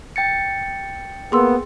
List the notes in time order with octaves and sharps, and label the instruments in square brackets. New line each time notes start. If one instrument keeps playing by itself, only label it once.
[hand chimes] G5 A6 C#7
[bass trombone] A#3 [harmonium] B3 [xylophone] G#4 C6 E6